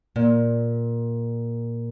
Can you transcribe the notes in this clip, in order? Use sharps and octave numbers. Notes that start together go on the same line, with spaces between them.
A#2